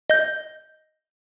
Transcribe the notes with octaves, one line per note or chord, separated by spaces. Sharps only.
D#5 G6